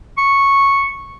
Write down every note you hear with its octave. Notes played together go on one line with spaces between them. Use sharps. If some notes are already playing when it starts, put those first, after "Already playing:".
C#6